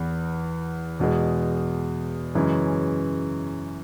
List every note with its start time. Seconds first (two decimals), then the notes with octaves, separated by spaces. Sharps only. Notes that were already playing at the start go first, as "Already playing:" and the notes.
Already playing: E2 E3 B3
1.00 E2 B2 G#3
2.35 F#2 C#3 E3 G#3 C#4